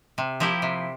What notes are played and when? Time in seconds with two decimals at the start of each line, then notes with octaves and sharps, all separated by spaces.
0.18 C3
0.40 F3 A#3 E4 G4
0.62 C3